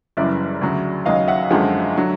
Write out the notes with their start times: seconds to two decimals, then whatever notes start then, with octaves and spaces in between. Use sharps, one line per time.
0.17 F#1 F#2 C#3 E3 G3 D5 E5
0.61 D2 C#3 F#3
1.06 D#2 C#3 F#3 D#5 F5
1.28 E5 F#5
1.51 G#1 F#2 D3 F3 G#3
1.96 D3 F#3